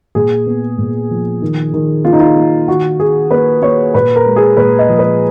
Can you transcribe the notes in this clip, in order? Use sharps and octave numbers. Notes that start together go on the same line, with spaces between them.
A#2 G#4
B3
A#2
F3
D#3
D#3
A#3 F4
D#4
F4
A#3
D#3 F#4
D#3 G#4
A#3 B4
A#3 C#5
A#2 B4
A#4
G#3
G#4
A#2 B4
D#5
F3
B4